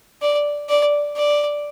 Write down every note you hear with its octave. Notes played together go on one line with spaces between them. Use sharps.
D5
D5
D5